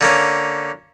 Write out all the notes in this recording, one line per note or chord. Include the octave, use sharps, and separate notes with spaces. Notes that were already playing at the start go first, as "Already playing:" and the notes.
D3 A#3 C#4